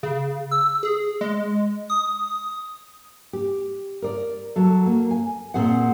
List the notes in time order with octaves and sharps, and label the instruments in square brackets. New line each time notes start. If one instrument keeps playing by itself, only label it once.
[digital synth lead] C#3
E6
G#4
G#3
D#6
[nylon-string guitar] G4
A#4 D5
F#3 A4
A#3
G#5
A#2 C4 G#4 F#5